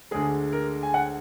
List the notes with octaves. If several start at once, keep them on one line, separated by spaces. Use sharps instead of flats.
D2 D3 G#3 G#4
A#4
G#5
F#5